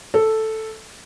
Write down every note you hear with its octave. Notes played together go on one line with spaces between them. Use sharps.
A4